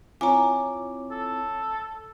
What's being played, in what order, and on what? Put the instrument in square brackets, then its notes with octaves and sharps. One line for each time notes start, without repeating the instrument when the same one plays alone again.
[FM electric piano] C4 E4 F4 [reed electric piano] C#5 D6 [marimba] G#5 A#5
[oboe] A4